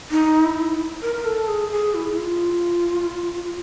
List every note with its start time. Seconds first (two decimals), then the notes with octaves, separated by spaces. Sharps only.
0.11 D#4
0.45 E4
1.02 A#4
1.15 A#4
1.25 A4
1.48 G#4
1.72 G#4
1.94 E4
2.12 E4
2.18 F4